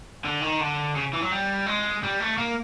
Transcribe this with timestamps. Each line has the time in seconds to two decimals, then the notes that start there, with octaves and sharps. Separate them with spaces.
0.24 D3
0.41 D#3
0.60 D3
0.95 C#3
1.13 E3
1.22 F#3
1.31 G3
1.66 G#3
2.03 G3
2.20 A3
2.38 A#3